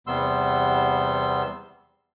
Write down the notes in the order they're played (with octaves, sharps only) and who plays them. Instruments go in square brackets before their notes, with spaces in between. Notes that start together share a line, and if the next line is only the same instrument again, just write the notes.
[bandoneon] E2 C3 G3 B3 C6 E6